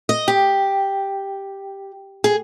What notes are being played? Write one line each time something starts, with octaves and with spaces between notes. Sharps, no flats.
D#5
G4
G#4